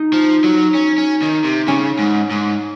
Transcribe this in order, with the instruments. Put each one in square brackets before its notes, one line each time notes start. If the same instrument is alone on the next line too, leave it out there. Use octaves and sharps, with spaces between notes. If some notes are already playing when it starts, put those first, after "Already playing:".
Already playing: [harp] D#4
[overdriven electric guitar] F3
F#3
C#4
C#4
D#3
C3
[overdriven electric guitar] C#3 [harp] C#4
[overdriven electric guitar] G#2
G#2